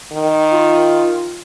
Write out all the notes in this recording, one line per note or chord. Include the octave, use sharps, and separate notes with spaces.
D#3
F4